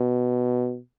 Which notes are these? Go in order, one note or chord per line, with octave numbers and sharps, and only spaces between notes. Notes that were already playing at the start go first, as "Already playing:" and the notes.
Already playing: B2